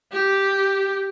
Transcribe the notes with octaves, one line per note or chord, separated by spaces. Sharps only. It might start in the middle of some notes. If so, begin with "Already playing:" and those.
G4